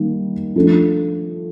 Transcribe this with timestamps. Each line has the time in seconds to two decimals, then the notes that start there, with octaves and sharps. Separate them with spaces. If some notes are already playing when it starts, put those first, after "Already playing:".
Already playing: D#3 G3 A#3
0.56 F3 A3 D4